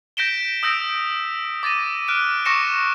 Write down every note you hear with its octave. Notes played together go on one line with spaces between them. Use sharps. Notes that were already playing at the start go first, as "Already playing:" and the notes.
G6 A#6 B6 D7 E7 G7
D#6 E6 G6 A#6 D7
D6 A6 A#6 D#7
F6 F#6 D7
C#6 D6 A#6 C#7 E7